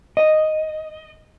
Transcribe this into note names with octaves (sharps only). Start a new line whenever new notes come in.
D#5